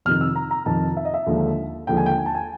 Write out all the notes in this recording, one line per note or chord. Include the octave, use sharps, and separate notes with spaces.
F2 C3 D#3 F6
E6
A#5
A#5
F2 C3 D#3 A5
E5
D#5
E5
D#2 D3 F3 G#3
D#2 D3 F3 G#3 G5
G#5
G5
G#5
A5
G#5